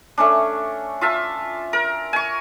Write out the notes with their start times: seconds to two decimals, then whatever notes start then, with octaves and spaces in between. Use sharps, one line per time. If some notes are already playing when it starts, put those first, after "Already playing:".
0.18 A3 C#4 D4
1.01 F4 E5 A5
1.73 A#4
2.13 G#5 C#6